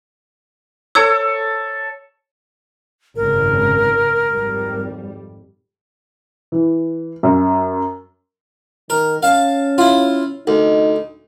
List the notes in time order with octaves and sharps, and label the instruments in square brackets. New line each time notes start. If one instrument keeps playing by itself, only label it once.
[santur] A4 C#5 [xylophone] E6 G#6
[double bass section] G#1 F#2 C#3 [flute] A#4
[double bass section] G#1 F2 G3
[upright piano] E3
F#2
[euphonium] D#3 [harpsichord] A#4
[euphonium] C#4 [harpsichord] F5 A5
[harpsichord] E4 F4
[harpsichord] D2 [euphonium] D#4